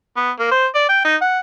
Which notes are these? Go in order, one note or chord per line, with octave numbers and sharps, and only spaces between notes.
B3
A#3
C5
D5
G5
D#4
F#5